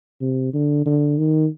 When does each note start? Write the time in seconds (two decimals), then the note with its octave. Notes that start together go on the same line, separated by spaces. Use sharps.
0.21 C3
0.53 D3
0.86 D3
1.18 D#3